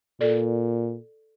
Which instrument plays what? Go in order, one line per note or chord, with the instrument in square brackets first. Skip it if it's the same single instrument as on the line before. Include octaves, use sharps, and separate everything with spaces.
[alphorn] A#2 [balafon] A4 D5